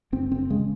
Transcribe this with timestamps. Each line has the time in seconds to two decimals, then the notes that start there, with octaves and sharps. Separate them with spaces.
0.12 F#1 C4
0.32 F#1 C4
0.50 C#3 G#3